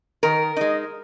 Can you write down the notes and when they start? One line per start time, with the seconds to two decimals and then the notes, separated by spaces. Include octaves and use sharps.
0.23 D#3 A#4
0.57 G#3 D#4